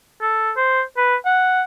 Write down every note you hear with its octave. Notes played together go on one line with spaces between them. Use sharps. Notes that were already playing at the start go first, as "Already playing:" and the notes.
A4
C5
B4
F#5